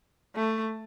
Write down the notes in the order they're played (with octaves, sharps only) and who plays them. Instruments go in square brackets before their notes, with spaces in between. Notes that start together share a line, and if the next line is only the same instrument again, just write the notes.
[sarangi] A3